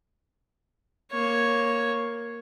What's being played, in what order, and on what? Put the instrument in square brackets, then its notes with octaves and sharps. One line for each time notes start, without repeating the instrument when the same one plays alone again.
[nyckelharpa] A#3 C#5